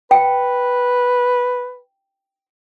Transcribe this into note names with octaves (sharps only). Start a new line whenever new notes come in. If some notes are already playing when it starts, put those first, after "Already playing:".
B4 G5